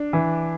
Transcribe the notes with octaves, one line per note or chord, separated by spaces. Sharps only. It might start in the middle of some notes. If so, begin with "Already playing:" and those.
Already playing: D4
E3